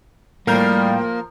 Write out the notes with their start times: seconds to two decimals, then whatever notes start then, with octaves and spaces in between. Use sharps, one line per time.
0.47 A2 F3 G3 A#3 A#4 F5 G5